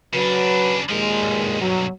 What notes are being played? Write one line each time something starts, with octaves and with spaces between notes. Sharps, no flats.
C#3 F#3 D4 B4
D#2 A#2 F3 G#3 A#4
B1 G2
F#3